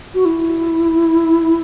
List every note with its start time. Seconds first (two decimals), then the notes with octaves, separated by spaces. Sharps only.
0.14 F#4
0.25 E4